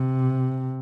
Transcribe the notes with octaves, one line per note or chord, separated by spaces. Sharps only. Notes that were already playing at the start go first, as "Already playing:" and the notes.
Already playing: C3